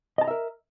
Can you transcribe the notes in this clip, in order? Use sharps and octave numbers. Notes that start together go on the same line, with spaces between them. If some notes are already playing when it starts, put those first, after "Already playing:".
A#4 D#5 E5 A5 A#5